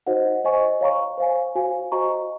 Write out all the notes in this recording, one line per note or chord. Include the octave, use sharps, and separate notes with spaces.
D#4 F#4 C5 D#5 F#5
C5 D#5 G#5 C#6
C#5 F5 A#5 C#6
C5 F5 G#5
F#4 C5 F5 G#5
F#4 C5 D#5 A#5 C#6